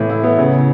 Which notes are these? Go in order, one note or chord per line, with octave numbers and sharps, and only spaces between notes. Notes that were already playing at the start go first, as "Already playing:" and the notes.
Already playing: A2 E3
E4
B3
C#3